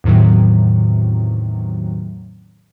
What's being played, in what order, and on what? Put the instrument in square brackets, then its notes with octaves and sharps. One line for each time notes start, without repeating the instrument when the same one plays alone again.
[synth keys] E2 A2 C3 D#3 F#3